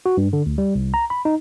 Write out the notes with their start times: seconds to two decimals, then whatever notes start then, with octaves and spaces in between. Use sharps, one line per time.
0.06 F#4
0.17 G2
0.33 D3
0.46 D2
0.58 G3
0.75 C2
0.94 A#5
1.10 B5
1.25 D#4